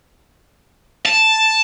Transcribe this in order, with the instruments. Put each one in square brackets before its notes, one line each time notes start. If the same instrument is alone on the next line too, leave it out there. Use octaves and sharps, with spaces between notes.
[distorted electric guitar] A5